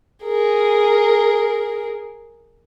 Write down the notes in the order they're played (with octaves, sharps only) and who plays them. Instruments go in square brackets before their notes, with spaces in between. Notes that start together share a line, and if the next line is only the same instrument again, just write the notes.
[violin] G#4 A#4